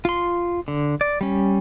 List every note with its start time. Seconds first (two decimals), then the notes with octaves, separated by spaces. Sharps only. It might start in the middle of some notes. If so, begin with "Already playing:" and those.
0.05 F4 C6
0.68 D3
1.01 D5
1.21 G3 C#4